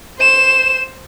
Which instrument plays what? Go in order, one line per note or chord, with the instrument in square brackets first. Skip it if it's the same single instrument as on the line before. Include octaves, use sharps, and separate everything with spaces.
[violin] C5 E7